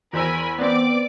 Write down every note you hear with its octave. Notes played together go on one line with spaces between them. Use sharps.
E2 A#4 C5 G#5 B5 E6
B3 C4 D5 D6